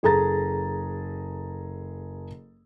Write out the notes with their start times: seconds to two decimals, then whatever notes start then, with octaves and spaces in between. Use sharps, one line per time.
0.03 F#1 G#4 A4 A#5 A6